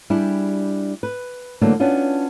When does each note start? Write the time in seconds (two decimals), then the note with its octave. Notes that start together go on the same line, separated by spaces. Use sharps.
0.10 G3 D4 E4 G4 G#4
1.03 B4
1.61 D3 E3 F#3 A3 A#3 D4
1.80 B3 C#4 D4 E4 F4